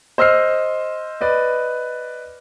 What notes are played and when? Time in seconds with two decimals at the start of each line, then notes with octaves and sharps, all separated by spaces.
0.18 C5 D#5 E6 F6 C7
1.21 B4 D5 D#5